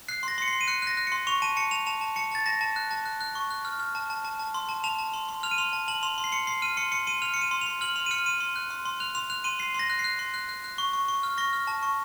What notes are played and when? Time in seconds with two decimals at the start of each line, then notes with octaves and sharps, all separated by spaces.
0.08 F#6 C7
0.23 C6 A#6
0.38 C6 C#7
0.48 C7
0.53 C6
0.61 D#7
0.68 F#6 C#7
0.82 F#6 A#6
0.97 F#6
1.07 C6 C#7
1.27 C#6 F7
1.42 A5 D#7
1.57 A5 C#7
1.71 A5 F7
1.86 A5 F7
2.01 A5
2.16 A5 C#7
2.31 A5 A6
2.46 A5 A#6
2.61 A5
2.76 F#6
2.91 A5
3.05 F#6
3.21 F#6
3.35 C#6
3.50 F#6
3.65 F6
3.80 F6
3.95 A5
4.10 A5
4.25 A5
4.39 A5
4.54 C6
4.69 A5
4.84 A5 F7
4.99 A5
5.14 C6
5.29 C6
5.43 F6 F7
5.51 D#7
5.58 C6 F7
5.73 A5
5.88 A5 F#7
6.03 C6 F7
6.18 C6
6.24 C7
6.32 C6 C#7
6.47 C6 C7
6.62 F6 D#7
6.77 C6 C#7
6.92 C6 C#7
7.07 C6 D#7
7.22 F6 F7
7.34 C6 C#7
7.41 D#7
7.51 C6
7.61 C6 F7
7.81 F6 F#7
7.96 C6 F7
8.06 D#7
8.11 F6 C#7
8.26 C6 D#7
8.40 C6
8.56 F#6
8.71 C6
8.86 C6
9.00 F#6 F7
9.15 C6 F7
9.30 F#6 F7
9.44 C6 D#7
9.59 C6 C7
9.74 C6 A#6
9.90 F#6
9.99 C7
10.04 F#6
10.19 C6
10.34 F#6
10.49 F#6
10.64 F#6
10.78 C#6
10.93 C#6
11.08 C#6
11.23 F6
11.38 C#6 A#6
11.53 F6
11.67 A5
11.83 C#6